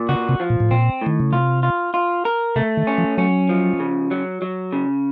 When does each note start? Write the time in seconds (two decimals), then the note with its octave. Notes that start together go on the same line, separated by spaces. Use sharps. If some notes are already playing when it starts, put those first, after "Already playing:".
Already playing: A#2
0.09 C#3 F#4
0.29 C3
0.40 F3
0.50 A#2
0.60 A2
0.71 A#2 C4
1.01 A2 D#3
1.20 C#3
1.33 C3 F4
1.63 F4
1.94 F4
2.25 A#4
2.56 C3 A3
2.77 D#3
2.87 C#4
2.98 F3
3.18 F#3 C#4
3.49 F3
3.80 C#3
4.11 F#3
4.42 F#3
4.73 C#3